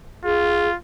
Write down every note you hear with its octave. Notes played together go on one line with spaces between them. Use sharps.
F4 G#4